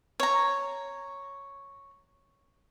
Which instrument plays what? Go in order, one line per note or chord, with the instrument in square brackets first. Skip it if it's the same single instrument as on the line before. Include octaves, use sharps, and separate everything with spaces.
[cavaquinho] C#5 A#5